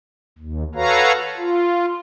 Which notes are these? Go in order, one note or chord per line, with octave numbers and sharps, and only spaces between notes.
D#2
F#4 A4 B4 C#5 F5 A#5
F4